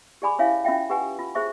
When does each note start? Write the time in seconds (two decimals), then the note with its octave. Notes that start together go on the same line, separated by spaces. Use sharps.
0.22 G4 G#4 D5 G#5 B5 D6
0.39 C#4 E4 C#5 E5 F5 G#5
0.65 C#4 F4 E5 G5
0.90 G4 B4 F#5 G#5
1.19 F4
1.35 G#4 C5 E5 C#6